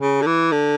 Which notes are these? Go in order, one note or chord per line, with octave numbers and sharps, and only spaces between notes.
C#3
D3
E3
D3